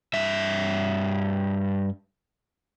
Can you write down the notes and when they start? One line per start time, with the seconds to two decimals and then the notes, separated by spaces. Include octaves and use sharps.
0.14 G2 E5